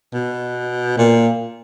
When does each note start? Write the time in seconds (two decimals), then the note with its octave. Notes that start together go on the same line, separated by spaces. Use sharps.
0.14 B2
0.98 A#2